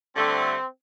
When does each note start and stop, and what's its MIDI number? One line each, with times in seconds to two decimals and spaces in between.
0.16 0.55 50
0.16 0.55 55
0.16 0.55 57
0.16 0.66 60